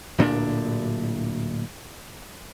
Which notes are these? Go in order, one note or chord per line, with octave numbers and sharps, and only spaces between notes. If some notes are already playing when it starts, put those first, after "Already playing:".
D1 A#2 C#4 D4